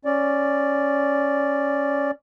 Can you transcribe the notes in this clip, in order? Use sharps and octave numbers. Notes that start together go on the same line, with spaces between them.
C#4 D5